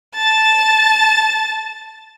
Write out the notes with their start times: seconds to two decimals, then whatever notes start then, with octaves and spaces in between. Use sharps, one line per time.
0.15 A5 A6